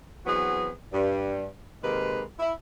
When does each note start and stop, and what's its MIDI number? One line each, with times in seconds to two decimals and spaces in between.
0.26 0.71 52
0.26 0.71 54
0.26 0.71 59
0.26 0.71 60
0.26 0.71 68
0.93 1.47 43
1.83 2.23 48
1.83 2.23 51
1.83 2.23 56
1.83 2.23 58
1.83 2.23 71
2.40 2.52 64